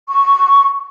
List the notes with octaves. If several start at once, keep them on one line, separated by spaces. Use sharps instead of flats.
C#6